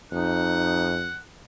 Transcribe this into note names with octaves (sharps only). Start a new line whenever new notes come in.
F2 D#4 F#5